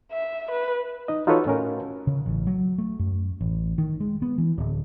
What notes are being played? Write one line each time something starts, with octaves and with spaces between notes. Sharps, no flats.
E5
B4
D#4 D#5
D#4 F4 F#4 A4 B4 C#5
A2 C#4 A#4
C#3
A1
F#3
A3
F#2
A1
D#3
G#3
B3
E3
D1